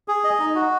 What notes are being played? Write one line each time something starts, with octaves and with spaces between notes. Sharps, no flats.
G#4
D#5
D#4
F#4